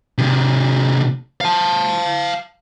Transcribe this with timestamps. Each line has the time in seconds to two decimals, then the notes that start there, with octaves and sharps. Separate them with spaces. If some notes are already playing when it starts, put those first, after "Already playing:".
0.18 C3 D#3
1.41 F5 A5